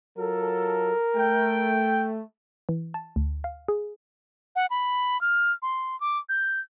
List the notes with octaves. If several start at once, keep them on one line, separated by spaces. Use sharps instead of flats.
F#3 F4 A4 A#4
A3 G5
E3
A5
D2
F5
G#4
F#5
B5
F6
C6
D6
G6